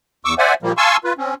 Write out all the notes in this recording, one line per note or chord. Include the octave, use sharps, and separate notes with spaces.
E2 C#6 D6 E6
C5 D5 E5 F#5 G#5
A#2 F3 G3 A#3
F5 G#5 A5 C6 C#6 E6
F4 B4
C4 C#4